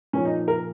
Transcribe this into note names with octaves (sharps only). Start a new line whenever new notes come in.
A#2 F3 A#3 C#4
D#4
A#4